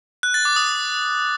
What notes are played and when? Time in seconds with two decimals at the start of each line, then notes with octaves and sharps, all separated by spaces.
0.23 F#6
0.34 A6
0.45 D6
0.56 D#6